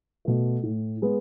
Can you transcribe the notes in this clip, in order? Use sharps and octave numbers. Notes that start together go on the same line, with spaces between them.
B2 A3
A2
G#3 B3